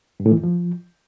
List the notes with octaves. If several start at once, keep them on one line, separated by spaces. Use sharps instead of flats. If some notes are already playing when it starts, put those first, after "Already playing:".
G2
A2
E3
F2
F3